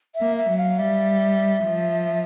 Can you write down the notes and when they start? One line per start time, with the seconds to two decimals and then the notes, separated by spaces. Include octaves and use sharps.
0.15 E5
0.21 A#3
0.36 E5
0.51 F#3
0.58 F5
0.78 G3 E5
1.65 F3